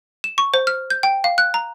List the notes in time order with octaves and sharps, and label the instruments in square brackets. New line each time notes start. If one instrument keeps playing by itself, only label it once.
[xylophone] E7
C#6
C5
F6
G6
G5
F5
F#6
A#5